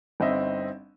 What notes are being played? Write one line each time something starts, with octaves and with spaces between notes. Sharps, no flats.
G1 C4 D#4 D#5 E5